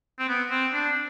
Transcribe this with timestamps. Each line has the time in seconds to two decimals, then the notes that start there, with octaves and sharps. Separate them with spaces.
0.19 C4
0.28 B3
0.50 C4
0.73 D4